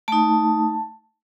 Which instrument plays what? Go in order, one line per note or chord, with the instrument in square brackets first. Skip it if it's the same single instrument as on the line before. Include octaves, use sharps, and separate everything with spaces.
[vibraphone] A3 D#4 A5